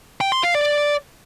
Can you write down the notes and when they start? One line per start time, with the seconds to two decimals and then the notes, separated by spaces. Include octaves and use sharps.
0.21 G5
0.32 C6
0.43 F5
0.55 D5